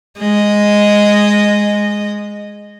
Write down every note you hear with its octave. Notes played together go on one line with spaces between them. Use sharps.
G#3 D#5